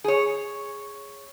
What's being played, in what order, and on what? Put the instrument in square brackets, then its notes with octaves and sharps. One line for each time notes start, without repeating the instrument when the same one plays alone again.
[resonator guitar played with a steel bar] G#4 C#5